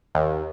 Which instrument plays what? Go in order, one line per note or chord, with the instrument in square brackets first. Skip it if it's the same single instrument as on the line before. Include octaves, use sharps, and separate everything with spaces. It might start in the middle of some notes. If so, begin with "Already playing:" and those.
[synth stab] D#2